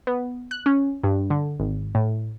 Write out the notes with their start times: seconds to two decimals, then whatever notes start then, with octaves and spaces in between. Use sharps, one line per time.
0.07 B3
0.51 F#6
0.66 C#4
1.03 G2
1.30 D3
1.60 G#1
1.95 A2